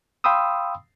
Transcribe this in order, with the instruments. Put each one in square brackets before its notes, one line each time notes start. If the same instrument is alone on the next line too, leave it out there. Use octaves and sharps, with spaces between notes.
[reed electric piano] F5 G5 B5 C6 D#6 E6